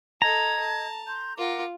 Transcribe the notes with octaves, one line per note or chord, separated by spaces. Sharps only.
A4 D#5 A#5 G#6
A5
C6 G6
F4 A#4 F#5 D6